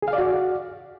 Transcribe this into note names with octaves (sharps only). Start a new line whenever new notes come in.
G#4
F5
D5
F#4